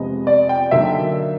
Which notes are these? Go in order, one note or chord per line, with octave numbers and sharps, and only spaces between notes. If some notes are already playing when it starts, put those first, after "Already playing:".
Already playing: F2 C3 F3 G#3 B3 D#5
D5
G5
D3 F#3 A#3 D#4 E5